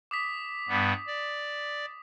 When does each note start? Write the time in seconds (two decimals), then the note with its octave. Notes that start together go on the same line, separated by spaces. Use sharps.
0.11 D6 D#6 B6
0.69 G2 G3 B3
1.07 D5